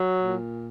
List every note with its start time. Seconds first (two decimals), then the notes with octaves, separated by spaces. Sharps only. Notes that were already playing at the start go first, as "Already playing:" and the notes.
Already playing: F#3
0.22 A#2